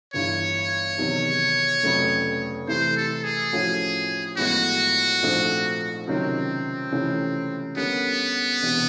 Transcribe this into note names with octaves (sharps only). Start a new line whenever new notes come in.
G1 G2 E3 C#5
E2 C3 D#3 F#3
F1 F2 C#3 F#3 A3
C3 E3 A3 C5
A4
G#4
A2 F3 A3 C#4 F#4
A1 A2 F3 G#3 B3 F#4
A#1 G#2 F3 A3 C4
C#2 C3 D#3 F#3 A#3 C4
C#2 C3 E3 A3 C#4
D3 G3 A#3 B3 C#4
E1 E2 C3